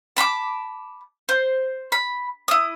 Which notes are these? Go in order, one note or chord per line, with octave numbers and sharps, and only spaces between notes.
A5 B5 C6 D6
C5
B5
E4 D#6